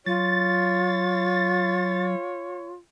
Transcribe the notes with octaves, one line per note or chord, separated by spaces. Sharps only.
F#3 F4 C#5 A6